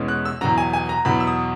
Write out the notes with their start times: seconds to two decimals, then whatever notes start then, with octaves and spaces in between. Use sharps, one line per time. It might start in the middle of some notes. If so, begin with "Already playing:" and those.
Already playing: E2 B2 G#3 C#4
0.08 F#6
0.25 E6
0.41 E2 B2 F#3 A#5
0.58 G#5
0.73 G#5
0.89 A#5
1.05 E2 B2 F#3 B5
1.20 E6
1.27 D#6